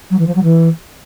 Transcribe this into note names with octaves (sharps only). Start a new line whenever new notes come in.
F#3
E3
F3
F#3
E3